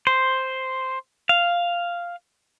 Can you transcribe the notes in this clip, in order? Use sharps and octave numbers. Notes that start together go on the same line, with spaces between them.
C5
F5